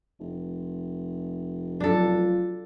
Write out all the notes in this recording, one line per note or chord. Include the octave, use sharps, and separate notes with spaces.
F1
F#3 D4 F4 A4